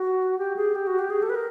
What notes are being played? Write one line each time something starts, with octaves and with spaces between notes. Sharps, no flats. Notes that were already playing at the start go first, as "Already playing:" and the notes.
Already playing: F#4
G4
G#4
G4
F#4
G4
G#4
A4
B4
A#4